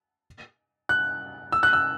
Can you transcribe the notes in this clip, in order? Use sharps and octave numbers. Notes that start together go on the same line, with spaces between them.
F#6
E6
F#6
E6